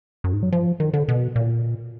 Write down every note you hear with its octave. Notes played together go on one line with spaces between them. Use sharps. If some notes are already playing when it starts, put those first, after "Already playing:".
F#2
G#2
F#3
F3
D#3
D3
B2
A#2